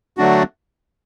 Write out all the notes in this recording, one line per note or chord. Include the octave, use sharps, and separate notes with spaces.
D3 F#3 A3 D4 F#4